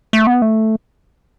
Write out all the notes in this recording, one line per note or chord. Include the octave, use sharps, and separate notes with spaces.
A3
B3
A3